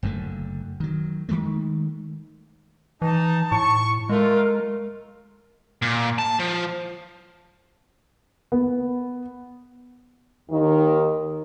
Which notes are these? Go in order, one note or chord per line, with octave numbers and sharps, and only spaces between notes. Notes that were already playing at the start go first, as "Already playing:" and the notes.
F#1 F#2 D3 A3
D#3 F#3
D#3 F3 G#3 A3
E3 D#4 A5
A2 C#6
G#3 A3 F4 A#4
A#2
A5
F3
B3
D#2 D#3